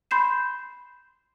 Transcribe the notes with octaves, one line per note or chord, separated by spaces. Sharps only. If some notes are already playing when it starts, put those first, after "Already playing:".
B5 C6 G6 C7 E7